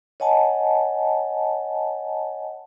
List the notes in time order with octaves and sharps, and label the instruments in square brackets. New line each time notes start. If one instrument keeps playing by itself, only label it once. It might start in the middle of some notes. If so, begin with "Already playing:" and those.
[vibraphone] C#5 D#5 F#5 G#5 A5